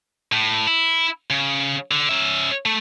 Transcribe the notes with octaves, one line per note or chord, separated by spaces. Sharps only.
A2
E4
C#3
D3
C#4 E5
A3